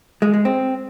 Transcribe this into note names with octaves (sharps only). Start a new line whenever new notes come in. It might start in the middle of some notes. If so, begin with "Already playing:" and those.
G#3
G#3
C4